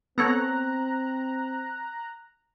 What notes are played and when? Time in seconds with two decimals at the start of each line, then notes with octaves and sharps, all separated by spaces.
0.18 B3 C4 A4 C#5 A#5 F#6